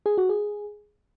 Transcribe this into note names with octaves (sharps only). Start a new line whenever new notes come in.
G#4
F#4
G#4